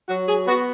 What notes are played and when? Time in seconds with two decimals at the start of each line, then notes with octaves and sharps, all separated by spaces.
0.08 F#3 F#4
0.28 G#4
0.47 B3 F#4